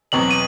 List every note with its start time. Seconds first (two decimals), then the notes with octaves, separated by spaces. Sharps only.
0.12 E2 B2 F#3 C4 F#7
0.31 D#7